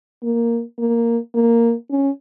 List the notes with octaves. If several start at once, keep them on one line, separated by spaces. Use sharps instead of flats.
A#3
A#3
A#3
C#4